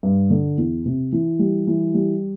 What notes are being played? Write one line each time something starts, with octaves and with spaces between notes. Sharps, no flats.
G2
D3
E2
C3
E3
G3
E3
G3